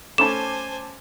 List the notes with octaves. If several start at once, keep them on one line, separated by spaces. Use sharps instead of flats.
A3 C#4 C5 G#5 A5 B5 D6 E7